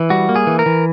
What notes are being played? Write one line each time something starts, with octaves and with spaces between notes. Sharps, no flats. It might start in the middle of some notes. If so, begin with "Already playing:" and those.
Already playing: E3
G3 F#4
A#3
G#4
E3
A#4
E3